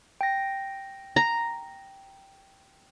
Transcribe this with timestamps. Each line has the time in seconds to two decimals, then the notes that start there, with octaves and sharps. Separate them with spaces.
0.21 G5 A#6
1.16 A#5